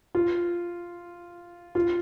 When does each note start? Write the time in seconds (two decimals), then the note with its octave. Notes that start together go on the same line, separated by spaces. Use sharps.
0.15 F4
1.75 F4